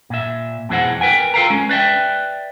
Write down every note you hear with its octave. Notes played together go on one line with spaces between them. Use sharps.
A#2 E5
F2 B2 E3 G#3 C5 F#5
A#4 B4 G5 G#5
F4 A4 C5 F5 G5 A#5
G#3 C#4
B4 D5 E5 G5